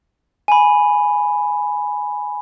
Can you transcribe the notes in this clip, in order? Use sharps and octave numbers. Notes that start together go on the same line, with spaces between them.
G#5 B5